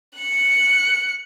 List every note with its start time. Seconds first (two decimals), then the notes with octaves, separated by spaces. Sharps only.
0.17 F#6 C#7